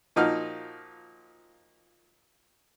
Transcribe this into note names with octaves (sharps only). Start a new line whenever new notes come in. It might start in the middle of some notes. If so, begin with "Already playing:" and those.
A#2 F3 D#4 F#4 F6